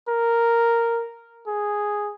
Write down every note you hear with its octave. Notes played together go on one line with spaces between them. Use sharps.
A#4
G#4